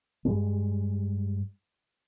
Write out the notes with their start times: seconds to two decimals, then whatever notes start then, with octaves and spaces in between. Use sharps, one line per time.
0.25 G2 G3 G#3